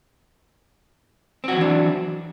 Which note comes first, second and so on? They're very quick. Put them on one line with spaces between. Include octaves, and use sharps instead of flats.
C4 F#4 F#3 E3 D4